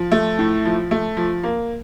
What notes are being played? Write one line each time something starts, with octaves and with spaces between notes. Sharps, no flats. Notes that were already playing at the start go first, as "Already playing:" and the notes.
Already playing: F3
A3
A2
F3
A3
F3
A#3